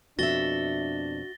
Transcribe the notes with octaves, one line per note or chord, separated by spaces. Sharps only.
F2 B2 D4 F#4 E5 A6 A#6 G7